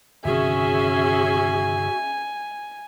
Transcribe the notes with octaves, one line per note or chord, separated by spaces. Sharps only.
G1 C3 D#3 C#4 F#4 G#4 E5 G#5